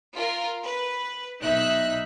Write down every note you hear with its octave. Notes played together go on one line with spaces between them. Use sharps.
F4 A#4
B4
B1 D#4 E5 F#6